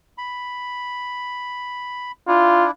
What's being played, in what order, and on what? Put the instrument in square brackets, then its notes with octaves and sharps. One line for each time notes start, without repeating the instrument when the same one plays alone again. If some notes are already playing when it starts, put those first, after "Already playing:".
[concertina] B5
[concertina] D4 E4 [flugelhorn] F4